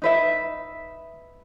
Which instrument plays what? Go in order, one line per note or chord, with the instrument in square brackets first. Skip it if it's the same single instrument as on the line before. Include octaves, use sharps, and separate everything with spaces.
[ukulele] D#4 B4 E5